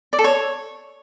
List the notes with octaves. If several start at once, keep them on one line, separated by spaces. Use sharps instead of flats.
D5
A4
C#5